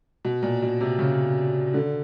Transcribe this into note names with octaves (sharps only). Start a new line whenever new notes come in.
B2
A#2
B2
C3
C#3
D3